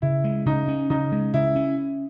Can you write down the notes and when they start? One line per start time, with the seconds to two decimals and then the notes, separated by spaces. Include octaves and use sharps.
0.02 C#3 E4
0.24 G#3
0.46 C#3 D#4
0.68 C#4
0.90 C#3 D#4
1.12 G#3
1.34 C#3 E4
1.56 C#4